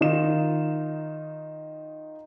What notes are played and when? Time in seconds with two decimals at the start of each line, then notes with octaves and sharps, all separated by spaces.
0.01 D#3 D#4 F4 E7